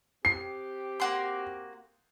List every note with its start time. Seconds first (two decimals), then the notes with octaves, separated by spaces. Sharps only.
0.25 C4 G4 C7
1.00 A#3 F#4 C6